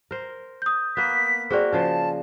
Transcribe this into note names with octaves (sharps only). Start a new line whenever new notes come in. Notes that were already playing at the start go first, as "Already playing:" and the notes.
A#4 C5
D#6 G6
A#3 B3 B6
C4 F#4 G#4 A#4 D5
C#3 F3 C5 A5